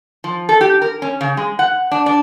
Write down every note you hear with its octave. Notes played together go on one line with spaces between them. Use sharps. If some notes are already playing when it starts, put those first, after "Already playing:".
F3
A4
G4
A#4
C#4
C#3
G#3
F#5
D4
D4